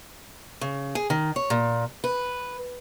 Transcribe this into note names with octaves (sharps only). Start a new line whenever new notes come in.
C#3
G#4
D#3
C#5
A#2
B4